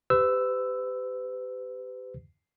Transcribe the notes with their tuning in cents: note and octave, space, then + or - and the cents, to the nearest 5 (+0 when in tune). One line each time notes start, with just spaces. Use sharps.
G4 +0 B4 +40 E6 +0